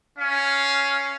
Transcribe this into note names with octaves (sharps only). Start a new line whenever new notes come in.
C#4 F5